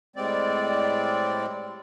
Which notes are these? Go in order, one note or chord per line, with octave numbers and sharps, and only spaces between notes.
A2 G3 G#3 C4 D5